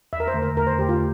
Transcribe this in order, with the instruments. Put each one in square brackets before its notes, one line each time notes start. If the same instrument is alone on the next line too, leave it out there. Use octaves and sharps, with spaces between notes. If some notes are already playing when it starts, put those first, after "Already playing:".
[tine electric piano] E2 [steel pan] E5
[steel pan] A#4
C5
[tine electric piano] D3 A3
[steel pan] A#4
[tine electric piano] E2 [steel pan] A#4
[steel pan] C5
[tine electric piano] D3 A3 [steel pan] G4
[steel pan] F4